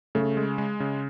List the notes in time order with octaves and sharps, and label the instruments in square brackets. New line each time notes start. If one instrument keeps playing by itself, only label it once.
[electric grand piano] C#3 [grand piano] A3
[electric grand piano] G#3
G#3
C#3